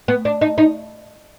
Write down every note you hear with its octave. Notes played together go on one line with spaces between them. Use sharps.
B3
D4
D#4
D#4